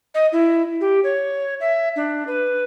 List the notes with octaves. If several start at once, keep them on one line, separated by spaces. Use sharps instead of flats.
D#5
E4
G4
C#5
E5
D4
B4